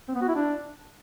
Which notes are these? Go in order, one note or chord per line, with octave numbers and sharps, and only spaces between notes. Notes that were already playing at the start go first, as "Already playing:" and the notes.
C4
B3
F#4
E4
D4